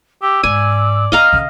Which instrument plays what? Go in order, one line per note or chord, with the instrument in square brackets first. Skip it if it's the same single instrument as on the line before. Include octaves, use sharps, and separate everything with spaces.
[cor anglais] G4 [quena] E6
[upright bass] G#2 [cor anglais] D5 [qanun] G#5
[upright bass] C4 [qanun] D#5 F5 A#5 [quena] F6
[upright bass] D3 C#4